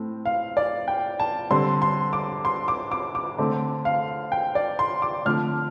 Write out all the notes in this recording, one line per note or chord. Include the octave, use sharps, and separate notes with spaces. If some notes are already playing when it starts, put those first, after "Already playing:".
Already playing: A2 A3 C4
F5
D5
G5
A5
D3 G3 C4 C6
C6
D6
C6
D6
D6
D6
D3 A3 C4
F5
G5
D5
C6
D6
D3 F3 A3 C4 F6